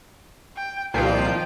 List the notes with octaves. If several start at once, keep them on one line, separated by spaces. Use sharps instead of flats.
G5
C2 A#2 D#3 F3 G5 C7